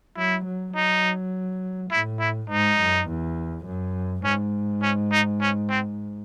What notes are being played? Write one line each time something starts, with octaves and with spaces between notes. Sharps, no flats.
F#3 E4
F#3
F#3 D#4
A2 E4
E4
G#2 D#4
F#2
E2
F#2
G#2 C#4
C#4
D#4
C#4
C4